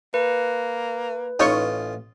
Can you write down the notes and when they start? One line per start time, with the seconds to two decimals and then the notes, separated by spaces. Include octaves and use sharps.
0.14 A#3 B4
1.40 A1 D#4 F4 C#5 D#5 C#6